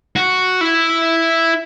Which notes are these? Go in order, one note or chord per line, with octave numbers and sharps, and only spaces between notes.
F#4
E4